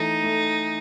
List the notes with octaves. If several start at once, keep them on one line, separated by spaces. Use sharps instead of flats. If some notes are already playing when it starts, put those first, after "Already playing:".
Already playing: E3 A3 D#4
A3